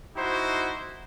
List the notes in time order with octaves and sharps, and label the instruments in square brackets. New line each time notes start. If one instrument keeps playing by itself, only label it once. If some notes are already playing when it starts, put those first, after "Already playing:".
[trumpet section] D#4 E4 F#4 C5